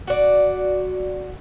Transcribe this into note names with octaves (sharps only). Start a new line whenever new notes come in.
F#4 D5